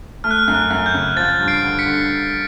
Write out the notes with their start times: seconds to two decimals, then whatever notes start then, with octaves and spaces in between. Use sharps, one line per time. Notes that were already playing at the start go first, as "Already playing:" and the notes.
0.24 A3 F6
0.31 F#6
0.39 F6
0.48 F#2
0.55 F#6
0.70 F#2
0.86 G6
0.94 C#3
1.16 F3 A6
1.40 G2
1.48 C7 D7
1.63 D3
1.79 B6 C#7
1.86 D3